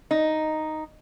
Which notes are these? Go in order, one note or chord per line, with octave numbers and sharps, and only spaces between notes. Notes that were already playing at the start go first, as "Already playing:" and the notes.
D#4